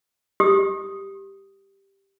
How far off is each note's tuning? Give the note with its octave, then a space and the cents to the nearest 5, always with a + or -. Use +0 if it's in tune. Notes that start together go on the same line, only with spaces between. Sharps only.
G4 +0 D#6 +0